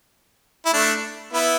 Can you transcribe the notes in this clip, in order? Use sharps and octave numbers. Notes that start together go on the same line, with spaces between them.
E4
A3 D4
B3 E4